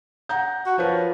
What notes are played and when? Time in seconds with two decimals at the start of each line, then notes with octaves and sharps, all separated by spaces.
0.29 F#5 A#5 G6
0.66 F#4
0.78 F3 A#4 B4 C#5